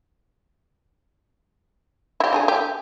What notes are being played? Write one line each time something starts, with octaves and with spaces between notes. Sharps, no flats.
E4 G4
D3 D#4 G#4
G4